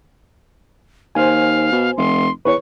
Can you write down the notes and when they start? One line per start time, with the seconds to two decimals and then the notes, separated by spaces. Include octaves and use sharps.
1.15 D#2 C5 F5 G#5
1.71 B2
1.97 F1 C6
2.45 E2 B4 C#5 C#6